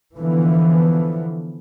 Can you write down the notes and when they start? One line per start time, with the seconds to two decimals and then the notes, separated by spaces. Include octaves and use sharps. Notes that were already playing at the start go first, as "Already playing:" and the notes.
0.17 D3 E3 F3 B3